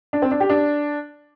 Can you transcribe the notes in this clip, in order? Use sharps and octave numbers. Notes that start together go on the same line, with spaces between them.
D4
C4
D4
G4
D4